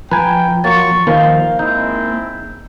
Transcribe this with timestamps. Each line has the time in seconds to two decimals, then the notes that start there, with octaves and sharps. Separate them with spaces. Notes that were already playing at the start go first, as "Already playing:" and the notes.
0.11 F3 B4 G5 G#5 A#5
0.64 F#3 A#3 C6 C#6 A6
1.07 D#2 D#3 F3 A#3 A#4 C5 F5
1.59 G#3 C4 D#4 E4 G6